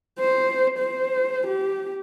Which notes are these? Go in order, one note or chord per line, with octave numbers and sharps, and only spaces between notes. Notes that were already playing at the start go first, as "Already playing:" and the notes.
C5
C5
G4